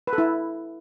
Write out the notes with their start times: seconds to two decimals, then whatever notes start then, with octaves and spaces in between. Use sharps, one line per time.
0.07 B4
0.13 A4
0.18 E4